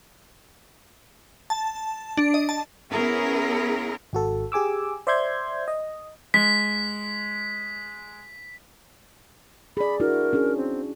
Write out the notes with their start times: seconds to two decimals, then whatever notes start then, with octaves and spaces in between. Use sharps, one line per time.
1.50 A5
2.17 D4
2.34 D#5
2.49 A5
2.92 B3 C#4 E4 G#4 A#4
4.13 G#1 F#4 A4
4.52 G4 G#4 G#5 D6 E6
5.07 C5 D5 E5 C6 G6 G#6
5.68 D#5
6.34 G#3 B6
9.77 G#4 D5 B5
10.00 D4 E4 F#4 A#4
10.33 C#4 D4 G#4
10.57 C4